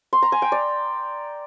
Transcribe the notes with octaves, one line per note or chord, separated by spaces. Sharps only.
C6
A#5
G#5
G5
D5